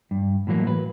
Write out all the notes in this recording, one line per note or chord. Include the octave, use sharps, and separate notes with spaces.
G2
A2 E3 F#3 A#3
B4